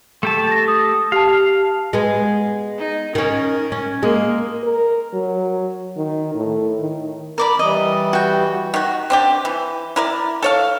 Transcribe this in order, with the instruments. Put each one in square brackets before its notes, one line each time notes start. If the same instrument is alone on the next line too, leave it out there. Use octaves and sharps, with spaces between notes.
[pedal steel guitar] A3 G4 A5
[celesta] A6 A#6
D#6
[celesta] G4 A5 [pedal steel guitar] F5
[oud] G#3 B3
[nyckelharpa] D#4
[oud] D#3 C#4 [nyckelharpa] A#4
[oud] C#4
[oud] G#3 [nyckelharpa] A#3
[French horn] A#4
F#3
D#3
A2
D#3
[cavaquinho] A#4 D5 B5
[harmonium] E3 G3 [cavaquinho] D#5
[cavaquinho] F#4 G5
[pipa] D#3 F#4
C4 D4 G4
E3
E4 A#4 D5
A4 C#5 F5